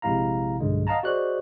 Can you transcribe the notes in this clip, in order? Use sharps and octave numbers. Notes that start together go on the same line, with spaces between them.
A#1 C3 G#3 E4 F5 A#5
B1 G2 D3 G#3
D#5 F5 F#5 A5 A#5
F#4 G#4 C5 D5 D#5 F#6